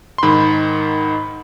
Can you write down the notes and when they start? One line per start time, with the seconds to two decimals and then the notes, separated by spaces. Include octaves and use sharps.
0.18 C6
0.23 G#2 D#3 B5